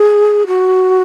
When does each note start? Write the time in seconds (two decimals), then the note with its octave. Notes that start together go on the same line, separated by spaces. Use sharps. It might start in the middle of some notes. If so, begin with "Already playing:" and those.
Already playing: G#4
0.47 F#4